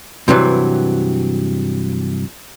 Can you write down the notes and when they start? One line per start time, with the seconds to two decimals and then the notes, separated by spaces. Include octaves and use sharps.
0.28 G2 C3 E3 F#3